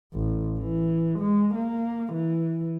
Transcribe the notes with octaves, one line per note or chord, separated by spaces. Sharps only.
A1
E3
G#3
A#3
E3